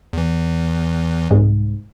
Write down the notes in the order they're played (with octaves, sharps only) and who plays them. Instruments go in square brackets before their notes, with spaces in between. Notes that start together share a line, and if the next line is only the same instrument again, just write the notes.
[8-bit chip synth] E2 E3
[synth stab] C2 G#2